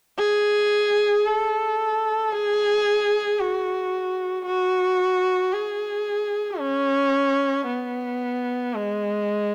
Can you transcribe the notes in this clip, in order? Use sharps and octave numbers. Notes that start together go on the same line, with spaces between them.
G#4
A4
G#4
F#4
F#4
G#4
C#4
B3
G#3